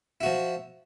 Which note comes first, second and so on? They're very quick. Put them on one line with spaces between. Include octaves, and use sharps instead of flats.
E4 F#4 F3